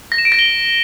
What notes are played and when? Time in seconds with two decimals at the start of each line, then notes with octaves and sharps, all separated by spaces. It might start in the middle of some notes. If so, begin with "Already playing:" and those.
0.12 A#6
0.18 E7
0.25 D7
0.32 A#6
0.39 G7